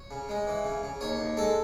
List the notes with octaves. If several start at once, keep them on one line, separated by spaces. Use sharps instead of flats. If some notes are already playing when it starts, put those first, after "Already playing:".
Already playing: C#5
C#3
G#3
E3
C#3
C#3
D#2 C#5
D#2
G#3 A4